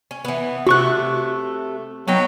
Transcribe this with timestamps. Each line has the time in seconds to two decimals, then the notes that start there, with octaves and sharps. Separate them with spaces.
0.11 C#4
0.25 E3 B3
0.67 C3 A3 F#4 C#6 F#6
2.08 F#3 B3 D#4 G5